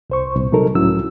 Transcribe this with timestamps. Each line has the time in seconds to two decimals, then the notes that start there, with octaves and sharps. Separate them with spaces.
0.10 C2 C5 C#6
0.36 C2 A#2
0.52 C3 F#3 G3 D#4 A4 A#4
0.75 C#2 A2 F#3 C#4 E4 E6